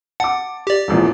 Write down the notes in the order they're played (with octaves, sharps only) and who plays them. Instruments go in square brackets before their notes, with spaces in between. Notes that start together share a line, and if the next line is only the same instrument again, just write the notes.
[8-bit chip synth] F#5 [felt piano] A5 D6
[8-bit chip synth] G4 D5
[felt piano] E1 A#1 E2